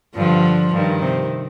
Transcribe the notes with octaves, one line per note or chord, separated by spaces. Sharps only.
G2 D3 F3
G2 D#3
C3